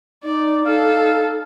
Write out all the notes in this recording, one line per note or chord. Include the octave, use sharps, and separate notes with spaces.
D#4 D5
D#4 A4 F5